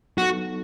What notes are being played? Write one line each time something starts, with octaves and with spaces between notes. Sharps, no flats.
F#3 B3 D#4 F#4 A4